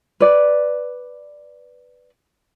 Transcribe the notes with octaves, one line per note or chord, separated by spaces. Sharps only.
B4 D5